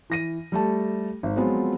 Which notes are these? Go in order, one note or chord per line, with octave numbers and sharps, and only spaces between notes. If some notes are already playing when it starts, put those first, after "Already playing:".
E3 A#6 D#7
G3 A3 A5
G#1
F3 F#3 G#3 B3 C4 F4